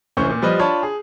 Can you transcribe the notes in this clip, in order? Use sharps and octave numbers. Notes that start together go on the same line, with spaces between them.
F1 E3 C#4 C5 C#6 G6
A#2
F3 G3 B4 D#5
D4 F4 C#5 A5 B5
G#4